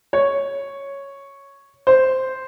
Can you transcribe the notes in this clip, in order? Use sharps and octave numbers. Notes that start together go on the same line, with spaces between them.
C#5
C5